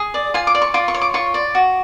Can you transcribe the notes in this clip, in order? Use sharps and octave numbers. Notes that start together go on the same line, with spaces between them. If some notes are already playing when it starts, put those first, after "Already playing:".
Already playing: G#4
D5
F4 G#5
D6
D5
C#6
F4 D6
C#6
C#5
D6
F4 C#6
D5
F#4